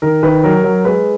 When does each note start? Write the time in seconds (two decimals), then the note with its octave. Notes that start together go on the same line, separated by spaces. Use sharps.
0.02 D#3 A#4
0.23 D#3 B4
0.44 F#3 A#4
0.64 F#3
0.85 G#3 B4